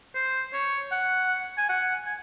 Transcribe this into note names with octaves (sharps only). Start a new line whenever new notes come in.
C5
C#5
F#5
G#5
F#5
G#5